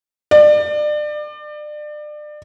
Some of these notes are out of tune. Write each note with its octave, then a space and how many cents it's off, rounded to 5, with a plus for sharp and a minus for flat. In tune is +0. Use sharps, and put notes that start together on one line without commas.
D5 +30